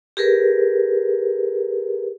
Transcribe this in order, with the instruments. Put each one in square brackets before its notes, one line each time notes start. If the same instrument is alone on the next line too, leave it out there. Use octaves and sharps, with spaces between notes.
[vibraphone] G4 G#4 A#4 B4